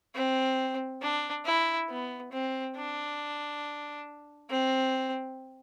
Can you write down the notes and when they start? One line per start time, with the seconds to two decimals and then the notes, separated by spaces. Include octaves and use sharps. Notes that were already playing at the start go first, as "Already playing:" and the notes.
0.15 C4
1.01 D4
1.45 E4
1.89 B3
2.32 C4
2.76 D4
4.50 C4